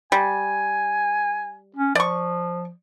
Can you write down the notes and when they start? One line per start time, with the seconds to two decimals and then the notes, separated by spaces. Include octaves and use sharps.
0.12 G3 G#5
1.76 C#4
1.95 F3 D5 C#6